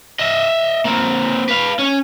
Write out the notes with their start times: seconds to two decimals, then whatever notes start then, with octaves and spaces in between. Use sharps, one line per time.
0.19 D#5 E5
0.85 A#3 C4
1.49 B4 F5
1.79 C#4